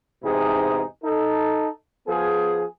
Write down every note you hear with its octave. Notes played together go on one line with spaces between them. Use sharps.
E2 G#2 C3 D#4 G#4
D#4 A4
F3 B3 G#4